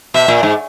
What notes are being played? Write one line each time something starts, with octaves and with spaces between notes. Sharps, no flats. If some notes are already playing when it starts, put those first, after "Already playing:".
B2 E5
A#2
G#2